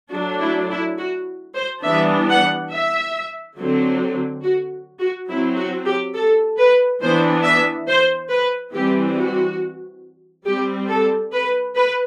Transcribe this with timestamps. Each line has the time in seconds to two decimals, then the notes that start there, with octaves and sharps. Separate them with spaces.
0.12 F#3 A3 D4 F#4
0.41 E4
0.71 E4
0.98 F#4
1.56 C5
1.84 E3 G3 B3 D4 E5
2.28 F#5
2.71 E5
3.57 D3 F#3 C4
4.43 F#4
5.00 F#4
5.30 F#3 C4 E4
5.57 F#4
5.87 G4
6.15 A4
6.59 B4
7.01 E3 B3 D4 C5
7.44 E5
7.87 C5
8.30 B4
8.74 E3 G3 C4 G4
9.17 F#4
10.46 G3 C4 G4
10.89 A4
11.32 B4
11.76 B4